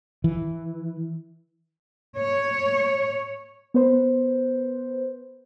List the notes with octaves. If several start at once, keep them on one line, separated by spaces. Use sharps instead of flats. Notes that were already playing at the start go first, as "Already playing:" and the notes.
E3
C#5
B3 B4 C5